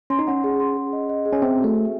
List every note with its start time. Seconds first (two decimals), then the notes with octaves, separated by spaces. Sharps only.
0.10 C#4 C6
0.19 D#4
0.27 C#4 F#5
0.44 G#4
0.60 C6
0.77 G#4
0.93 D#5
1.09 D#5
1.25 G#4
1.32 C#4
1.42 C4 E5
1.59 F#4
1.64 A3
1.75 E5